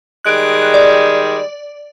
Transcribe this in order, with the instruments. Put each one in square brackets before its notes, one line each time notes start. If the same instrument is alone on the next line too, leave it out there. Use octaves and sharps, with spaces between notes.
[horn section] D#3 G3 G#3 [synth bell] F#6 D7
[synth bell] D5